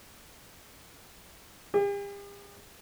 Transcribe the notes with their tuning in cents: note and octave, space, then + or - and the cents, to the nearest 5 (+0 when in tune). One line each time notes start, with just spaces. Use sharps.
G4 +45